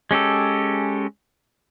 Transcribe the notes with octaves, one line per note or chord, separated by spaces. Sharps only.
G#3 C#4 G4 A4